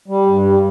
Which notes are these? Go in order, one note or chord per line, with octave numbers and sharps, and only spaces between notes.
G3
G2
G3